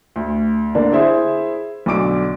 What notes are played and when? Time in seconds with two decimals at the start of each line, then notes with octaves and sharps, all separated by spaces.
0.16 D2
0.75 D3 A#3 D4 D5
0.93 E4 G#4 C5 E5
1.86 B1 D3 D6 D7